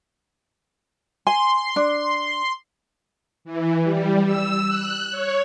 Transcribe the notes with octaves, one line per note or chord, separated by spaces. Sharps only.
G#5 C6
D4
E3
G3
E6
F#6
C#5